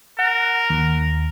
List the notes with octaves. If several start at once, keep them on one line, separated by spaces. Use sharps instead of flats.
A#4 F#5
D#2